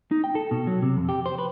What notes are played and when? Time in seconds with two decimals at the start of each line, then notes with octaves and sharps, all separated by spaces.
0.11 D#4
0.24 G5
0.35 A4
0.51 B2
0.67 F#3
0.82 C3
0.97 F2
1.09 G4
1.26 C5
1.38 B4